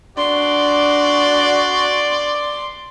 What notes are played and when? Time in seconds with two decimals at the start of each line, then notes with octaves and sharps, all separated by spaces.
0.17 D4 F#4 D5 C6